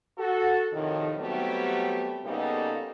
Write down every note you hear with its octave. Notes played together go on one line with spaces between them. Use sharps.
F#4 A4
F2 A2 C3 D#3
F#3 G3 A3 B3 C4 G4
C#3 G3 A#3 B3 D#4 A4